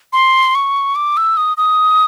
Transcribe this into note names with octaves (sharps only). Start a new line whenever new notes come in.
C6
C#6
D6
E6
D#6
D#6